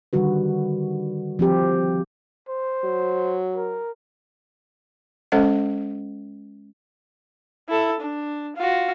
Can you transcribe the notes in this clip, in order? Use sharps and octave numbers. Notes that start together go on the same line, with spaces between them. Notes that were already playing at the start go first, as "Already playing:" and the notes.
D3 D#3 G3 F#4 B4
F3 C4 G4
C5
F#3
A#4
G#3 C#4 A4 C5 D#5 F#5
E4 A4
D4
F4 F#4